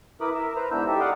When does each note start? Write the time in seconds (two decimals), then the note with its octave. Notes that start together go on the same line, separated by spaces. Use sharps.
0.21 E4 A#4 B4 B5 D6 D#6
0.34 A#4 E5
0.56 B4 C5 A#5
0.71 G#2 B3 D4 E4 E6 G6
0.87 D#4 G4 A4 E5
1.00 D5 F5 F#5 C6 D6 D#6